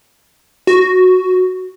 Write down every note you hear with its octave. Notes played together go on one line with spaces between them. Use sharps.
F#4